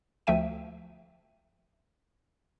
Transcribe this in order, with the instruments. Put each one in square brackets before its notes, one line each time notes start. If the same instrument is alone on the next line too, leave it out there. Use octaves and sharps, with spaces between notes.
[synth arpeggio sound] D2 F3 A3 E5 G5 D#7